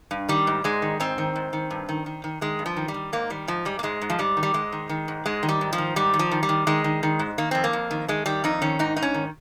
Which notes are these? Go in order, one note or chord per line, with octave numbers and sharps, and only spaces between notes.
G2
D#3 G3
G#2
G#2 G#3
D#3
G#2 C4
D#3
G#2
D#3
G2
D#3
D#3
D#3
D#3 G#3
G2
F3
D#3
G3
D#3
G#2 A#3
D#3 G3
G#2 F3
G#2 G3
A#3
G#2 G#3
G#2
F3
G#2 G3
D#3
G3
G#2 G#3
D#3
D#3
G#2
G#2 G#3
D#3
G3
G#2
F3
D#3
G#2 G3
D#3
F3
D#3
G3
D#3
D#3 G#3
D#3
D#3
G#2
D#3 A#3
F2 C4
A#3
F2
D#3
D#3 G#3
D#3 G3
F2 D#4
D#3 C#4
G#2 D#4
G#2 D#4
C#4
D#3